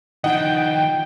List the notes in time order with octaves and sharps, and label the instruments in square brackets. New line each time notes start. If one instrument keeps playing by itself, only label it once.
[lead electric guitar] D#3 F3 [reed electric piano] D#4 D#5 [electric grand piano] F#5 [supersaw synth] G5